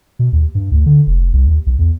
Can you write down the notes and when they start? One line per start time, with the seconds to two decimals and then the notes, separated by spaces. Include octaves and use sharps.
0.19 B2
0.33 D#2
0.55 G2
0.72 D2
0.86 D3
1.07 F1
1.33 C2
1.47 D#2
1.66 B1
1.79 E2